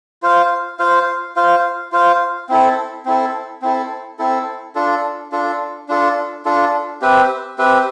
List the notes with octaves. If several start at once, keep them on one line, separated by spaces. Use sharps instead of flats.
F4 C5 F5
F4 C5 F5
F4 C5 F5
F4 C5 F5
C4 E4 A4
C4 E4 A4
C4 E4 A4
C4 E4 A4
D4 F4 A4
D4 F4 A4
D4 F4 A4
D4 F4 A4
C4 G4 B4 E5
C4 G4 B4 E5